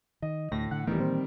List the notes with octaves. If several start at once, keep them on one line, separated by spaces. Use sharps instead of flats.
D#3 D#5
D2 A2 A#6
D3 F#5
D#1 D#3 E3 G3 A3 B3
A#2 E3 A#3 C4